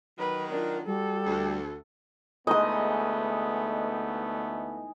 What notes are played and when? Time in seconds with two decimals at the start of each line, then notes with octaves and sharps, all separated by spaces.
0.19 D#3 F#3 B4
0.51 D4 F4 A#4
0.86 G3 F#4 A4
1.26 D2
2.47 D2 E3 G#3 A3 B3 D#4 D#5 D#6